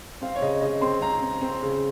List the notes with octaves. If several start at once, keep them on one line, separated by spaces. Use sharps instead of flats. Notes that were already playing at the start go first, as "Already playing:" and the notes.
C4 F5
C#5
C#3 D#5
C#3 D#5
C4 C6
C4 A#5
C4
C4
C#3